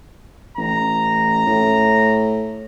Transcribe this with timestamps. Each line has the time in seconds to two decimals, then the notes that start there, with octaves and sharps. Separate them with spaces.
0.57 A1 A#5
1.47 A2